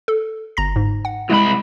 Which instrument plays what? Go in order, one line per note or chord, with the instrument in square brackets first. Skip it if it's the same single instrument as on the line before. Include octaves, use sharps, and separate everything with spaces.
[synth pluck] A4
G1 A#5 A#6
G#2
F#5
[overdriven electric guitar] C2 B5 [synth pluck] G#3 E4